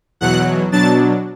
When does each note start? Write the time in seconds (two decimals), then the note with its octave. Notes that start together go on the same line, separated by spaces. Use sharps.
0.21 E2 B2 F#3 F#5 F#6
0.72 B2 F#3 D4 A5 A6